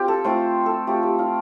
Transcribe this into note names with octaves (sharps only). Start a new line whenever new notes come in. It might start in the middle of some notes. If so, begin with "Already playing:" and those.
Already playing: C4 F4 G4
A4
A3 C4 F4 C5
A4
A3 C4 F4 G4
G4
F4